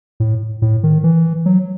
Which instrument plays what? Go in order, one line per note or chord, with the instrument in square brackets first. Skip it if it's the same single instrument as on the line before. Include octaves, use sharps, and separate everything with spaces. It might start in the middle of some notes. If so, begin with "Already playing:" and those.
[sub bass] A2
A2
D#3
E3
F#3